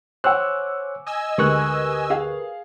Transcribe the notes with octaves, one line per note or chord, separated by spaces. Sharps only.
C5 C#5 F#5 G#5 D6 E6 F#6
D#5 G#5 E6
D2 G#3 G4 A#4 B4 C#6 F#6
G#4 F5